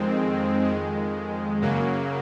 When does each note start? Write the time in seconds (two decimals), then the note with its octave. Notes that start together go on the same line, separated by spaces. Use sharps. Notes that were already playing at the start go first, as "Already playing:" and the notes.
Already playing: F2 D#3 G#3 C4
0.64 F2 D#3 G#3
1.61 F#2 C#3 F#3 A#3